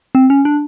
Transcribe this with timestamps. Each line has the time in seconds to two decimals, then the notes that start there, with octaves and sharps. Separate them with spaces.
0.15 C4
0.30 C#4
0.45 D4